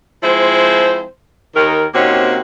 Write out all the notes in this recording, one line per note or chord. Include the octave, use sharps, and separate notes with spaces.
F3 G#3 C4 E4 C5
D#2 D#3 A#4
C3 A#3 C4 C#4 D#4 F#4